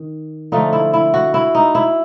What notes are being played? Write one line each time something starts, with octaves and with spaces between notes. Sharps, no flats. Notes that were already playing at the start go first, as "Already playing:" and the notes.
Already playing: D#3
D3 F3 A3 D#4
E4
E4
F#4
E4
D#4
E4